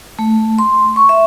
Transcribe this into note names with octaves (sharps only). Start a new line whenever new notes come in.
A3
C6
C#6
E5